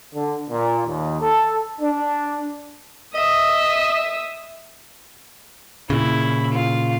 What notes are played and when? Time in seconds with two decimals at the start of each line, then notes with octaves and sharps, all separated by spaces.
0.14 D3
0.50 A#2
0.86 D#2
1.21 A4
1.81 D4
3.15 D#5 E5 D#6
5.90 A#2 C#3 E4
6.53 F4